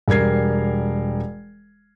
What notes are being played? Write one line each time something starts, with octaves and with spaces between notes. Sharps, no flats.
E1 G3 A#4 G#6 C7